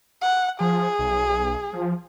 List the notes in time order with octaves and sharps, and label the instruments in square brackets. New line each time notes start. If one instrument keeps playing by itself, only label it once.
[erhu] F#5
[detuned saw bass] F3 [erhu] G#4
[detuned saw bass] B1
F3